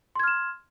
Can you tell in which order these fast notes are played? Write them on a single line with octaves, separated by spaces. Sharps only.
C6 G#6 F6 E7